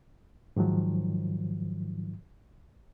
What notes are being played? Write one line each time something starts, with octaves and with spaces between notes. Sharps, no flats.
G#2 D#3 F3 F#3